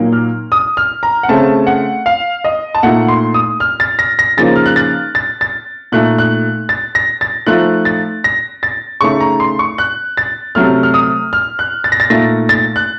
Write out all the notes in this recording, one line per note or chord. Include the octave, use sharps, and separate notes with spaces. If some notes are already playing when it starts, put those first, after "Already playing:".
Already playing: A#2 F#3 A#3 D#4
F6
D#6
F6
A#5
F#5
C#3 A3 C4 A5
F#5
F5
D#5
A5
A#2 A3 D#4 F#5
C6
D#6
F6
A6
A#6
A#6
C#3 F3 A#3 D#4 A6
F6
F#6
A6
A6
A6
A#2 A3 D#4 F#6
F#6
A6
A#6
A6
F3 A3 D#4 F#6
A6
A#6
A6
C#3 A3 D#4 C#6
A#5
C6
C#6
F#6
A6
C3 F#3 A3 F6
F6
D#6
F6
F#6
A6
A#6
A6
A#2 A3 D#4 A#6
A6
F#6